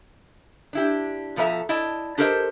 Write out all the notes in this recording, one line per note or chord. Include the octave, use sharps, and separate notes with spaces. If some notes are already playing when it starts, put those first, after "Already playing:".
D4 E4 G4
B2 F3 A4 A#4 E5 A#5
E4 D5 D#5 A5
D4 G4 A4 A#4 C5 D#5